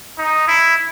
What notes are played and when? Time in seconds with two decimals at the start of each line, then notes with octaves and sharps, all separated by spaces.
0.18 D#4
0.48 E4